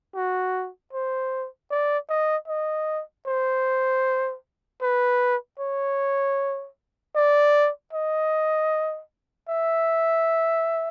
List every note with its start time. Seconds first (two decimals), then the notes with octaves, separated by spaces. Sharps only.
0.15 F#4
0.93 C5
1.71 D5
2.09 D#5
2.48 D#5
3.27 C5
4.82 B4
5.60 C#5
7.16 D5
7.93 D#5
9.49 E5